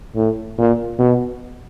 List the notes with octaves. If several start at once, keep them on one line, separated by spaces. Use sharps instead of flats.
A2
A#2
B2